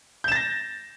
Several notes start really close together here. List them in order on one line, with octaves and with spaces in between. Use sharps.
G6 E7 A6 A#6